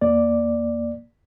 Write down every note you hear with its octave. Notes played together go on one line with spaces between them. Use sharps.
E2 A#3 D5